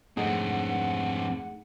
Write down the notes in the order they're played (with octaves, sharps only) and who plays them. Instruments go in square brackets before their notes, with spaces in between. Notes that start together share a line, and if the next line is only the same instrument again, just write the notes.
[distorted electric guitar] F2 G#2 [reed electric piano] A3 D#4 G#4 [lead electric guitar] C4 D4 [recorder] F#5